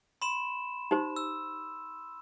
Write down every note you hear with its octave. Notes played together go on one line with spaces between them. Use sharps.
B5 C6 E7
D#4 G4 C5
E6